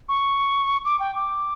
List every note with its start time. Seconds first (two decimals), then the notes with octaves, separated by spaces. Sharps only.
0.09 C#6
0.85 D6
1.00 G5
1.15 D6